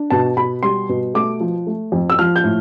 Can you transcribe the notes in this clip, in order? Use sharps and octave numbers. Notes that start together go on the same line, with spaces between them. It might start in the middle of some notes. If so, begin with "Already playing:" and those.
Already playing: D4
B2 A5
B2 B5
G3 C6
B2
A3 D6
F3
A3
F2
E6
F3 F6
G6
A2